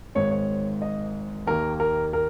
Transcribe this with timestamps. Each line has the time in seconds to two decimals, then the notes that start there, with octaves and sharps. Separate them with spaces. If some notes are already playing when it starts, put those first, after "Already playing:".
0.15 G#1 G#2 D#3 C#5
0.31 C#5
0.82 D#5
1.47 D#2 D#3 A#3 A#4
1.80 A#4
2.13 A#4